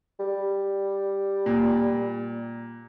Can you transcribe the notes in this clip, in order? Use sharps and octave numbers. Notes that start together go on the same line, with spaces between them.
G3
A#2